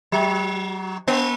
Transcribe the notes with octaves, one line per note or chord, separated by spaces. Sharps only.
F#3
A#3